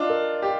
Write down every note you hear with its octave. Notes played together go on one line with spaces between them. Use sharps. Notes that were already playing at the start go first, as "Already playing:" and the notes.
Already playing: D4 F4 D#5
A#4
G4